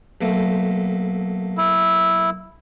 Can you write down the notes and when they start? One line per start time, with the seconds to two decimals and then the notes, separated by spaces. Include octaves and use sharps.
0.21 B1 A3 A#3
1.57 E4